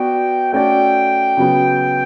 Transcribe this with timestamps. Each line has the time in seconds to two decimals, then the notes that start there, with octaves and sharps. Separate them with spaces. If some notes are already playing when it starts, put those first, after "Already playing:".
Already playing: B3 F#4 B4 D5 G5
0.53 A3 C#4 F#4 A4 D5 G5
1.37 C#3 F#3 B3